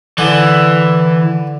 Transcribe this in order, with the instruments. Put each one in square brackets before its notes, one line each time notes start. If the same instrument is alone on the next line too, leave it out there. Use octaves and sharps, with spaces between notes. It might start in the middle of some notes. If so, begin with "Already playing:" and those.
[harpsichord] D3 [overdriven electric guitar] E3